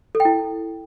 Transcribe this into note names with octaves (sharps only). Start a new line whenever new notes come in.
A4
G5
E4